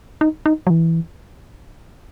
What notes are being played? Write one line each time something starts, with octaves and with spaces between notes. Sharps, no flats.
D#4
D#4
F#3
E3